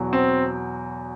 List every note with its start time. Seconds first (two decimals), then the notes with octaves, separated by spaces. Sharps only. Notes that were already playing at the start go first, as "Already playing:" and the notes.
Already playing: E2 B2 F#3
0.13 C4